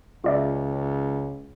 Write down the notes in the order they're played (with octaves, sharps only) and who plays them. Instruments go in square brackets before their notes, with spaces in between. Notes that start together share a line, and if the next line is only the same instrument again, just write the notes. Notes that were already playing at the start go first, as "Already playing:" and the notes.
[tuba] C#2 [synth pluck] F4 D5 E5